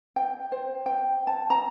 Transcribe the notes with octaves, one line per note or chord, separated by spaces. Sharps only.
G5
C5
G5
A5
A#5